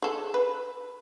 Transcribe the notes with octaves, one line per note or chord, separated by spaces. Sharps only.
G#4 A4
B4